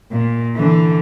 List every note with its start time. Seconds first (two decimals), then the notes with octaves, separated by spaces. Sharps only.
0.12 A#2
0.56 D3 E3